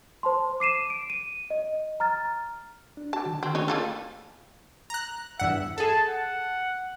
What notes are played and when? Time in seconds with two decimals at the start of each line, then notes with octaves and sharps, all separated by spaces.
0.23 C5 A5 C6
0.60 D6 C7 D#7 E7
0.90 D7
1.10 D#7
1.50 D#5
2.00 A#5 F6 A6
2.97 D4
3.13 F#4 A5 D6
3.26 D3 D#3
3.43 C4 F#4
3.55 A3 A#3 D4 D#4 G4 C#5
3.68 A#3 F4 A4 G5 G#5 D6
4.90 A#5 F#6
5.40 E2 G2 E5 F#5
5.78 G#4 A4 A5
6.09 F#5